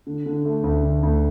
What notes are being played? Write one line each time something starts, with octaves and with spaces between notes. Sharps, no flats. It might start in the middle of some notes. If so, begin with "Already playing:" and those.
D3
D3
A3
D2
D3
D2